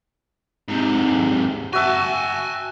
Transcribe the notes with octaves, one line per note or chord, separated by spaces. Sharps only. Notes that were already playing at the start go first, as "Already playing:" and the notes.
G#2 C3
F#4 E5 G#5 A5